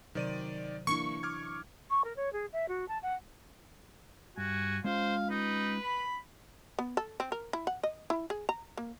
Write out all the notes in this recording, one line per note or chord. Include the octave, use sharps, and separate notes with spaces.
C3 D#3 F#3 C5 D5 D#7
E3 A#3 D4 E4 C#6
D6 F6 G#6
C#6
A#4
C#5
G#4
E5
F#4
A5
F#5
G2 F#4 G#5
G#3 C#4 F4 C5 F5
D#4 B4
B5
B3
A4
C4
A#4
E4
F#5
D#5
E4
G#4
A#5
A#3